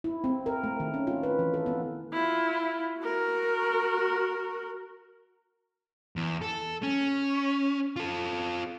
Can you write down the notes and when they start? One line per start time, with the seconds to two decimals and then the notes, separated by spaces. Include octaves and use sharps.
0.04 E4
0.24 C4
0.46 A#4
0.64 A3
0.80 D#3
0.94 C#4
1.07 F4
1.23 B4
1.39 E3
1.54 A4
1.66 B3
2.13 E4 F4
2.99 F#4 A#4
6.16 E2
6.42 A4
6.83 C#4
7.96 F4 A4